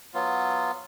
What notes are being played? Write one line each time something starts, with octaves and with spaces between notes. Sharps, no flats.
F#3 B3 F4